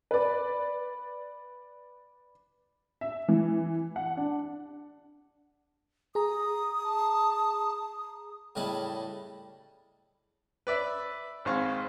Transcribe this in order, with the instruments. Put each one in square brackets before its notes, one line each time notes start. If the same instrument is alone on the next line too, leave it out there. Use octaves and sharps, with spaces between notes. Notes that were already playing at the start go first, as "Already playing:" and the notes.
[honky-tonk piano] B4 D5
E5
E3
F#5
D4
[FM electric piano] G#4 A#5 [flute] D#6
[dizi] A5
[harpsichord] A2 C#3 G3 D#5 A5 B5
[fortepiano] B4 D5 E5
G#1 G#2 C4 F5 C#6